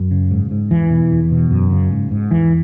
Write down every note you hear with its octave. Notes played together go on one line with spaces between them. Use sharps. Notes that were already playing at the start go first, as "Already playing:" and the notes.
Already playing: F#2
C#3
G#2
G#2
E2 E3
B2
E2
B2
F#2
C#3
G#2
G#2
E2 E3